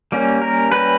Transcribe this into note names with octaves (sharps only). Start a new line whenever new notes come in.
G3 A#3 C#4
A#4
G3 A#3 C#4 B4